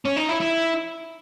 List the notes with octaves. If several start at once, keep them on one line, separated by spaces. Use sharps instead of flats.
C#4
D#4
E4
E4